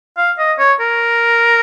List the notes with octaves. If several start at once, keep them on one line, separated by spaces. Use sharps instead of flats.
F5
D#5
C#5
A#4